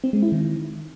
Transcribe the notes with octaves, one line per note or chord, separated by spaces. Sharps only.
C4
G#3
E4
D#3